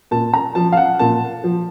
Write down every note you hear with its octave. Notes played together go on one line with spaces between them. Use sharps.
A#2 A5
A#5
F3 A5
F5
F#5
A#2 A5
F3